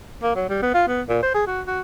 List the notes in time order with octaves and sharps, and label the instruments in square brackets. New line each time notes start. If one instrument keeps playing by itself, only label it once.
[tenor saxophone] A#3
F#3
G3
B3
F4
B3
A#2
C5
G#4
F#4
F#4